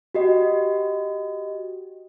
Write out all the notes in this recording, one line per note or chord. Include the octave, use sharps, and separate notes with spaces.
F#4 G4 D#5